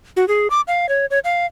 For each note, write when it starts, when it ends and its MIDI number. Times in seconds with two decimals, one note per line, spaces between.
0.17 0.28 66
0.28 0.48 68
0.50 0.61 86
0.68 0.89 77
0.89 1.06 73
1.11 1.19 73
1.24 1.46 77